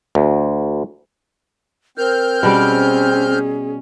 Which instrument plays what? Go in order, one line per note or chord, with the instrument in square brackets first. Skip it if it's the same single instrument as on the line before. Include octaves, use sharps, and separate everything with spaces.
[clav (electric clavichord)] D2
[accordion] C4 F6 G6 [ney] A#4
[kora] B2 G3 D5 [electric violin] C#4 [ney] G#4